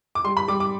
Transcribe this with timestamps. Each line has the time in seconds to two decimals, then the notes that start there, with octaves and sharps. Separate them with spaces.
0.15 D6
0.24 G3 C6
0.37 B5
0.48 G3 D6
0.60 D6